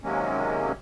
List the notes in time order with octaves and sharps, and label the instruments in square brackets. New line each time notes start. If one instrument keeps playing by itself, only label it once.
[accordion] C3 D#3 F#3 G#3 A#3 C#4